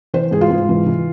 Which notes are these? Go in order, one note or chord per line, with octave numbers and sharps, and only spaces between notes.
E3 C5
G#2 G#4
F4
G#2
E3
E3